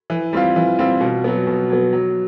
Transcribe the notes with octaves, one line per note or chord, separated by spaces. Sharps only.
E3
G3 C4 F4
E3
G3 C4 F4
B2
F#3 B3
B2
F#3 B3
F#3